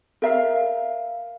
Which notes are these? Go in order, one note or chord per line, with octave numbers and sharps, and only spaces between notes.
A#4 E5 F5